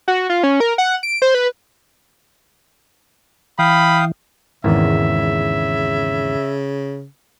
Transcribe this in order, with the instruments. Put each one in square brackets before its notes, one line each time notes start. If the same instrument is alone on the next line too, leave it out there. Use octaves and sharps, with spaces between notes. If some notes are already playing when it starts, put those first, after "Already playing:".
[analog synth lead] F#4
F4
C#4
A#4
F#5
D7
C5
B4
[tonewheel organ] E3 [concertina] F5 G5 D#6 [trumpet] B5
[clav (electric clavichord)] G#1 E2 A#4 [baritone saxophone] C#3 [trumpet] E5